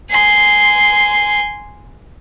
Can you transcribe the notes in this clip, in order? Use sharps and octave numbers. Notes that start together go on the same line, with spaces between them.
G#5 C6